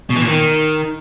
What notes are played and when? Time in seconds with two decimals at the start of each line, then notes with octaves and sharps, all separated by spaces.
0.10 B2
0.16 E3
0.22 A#2
0.28 D#3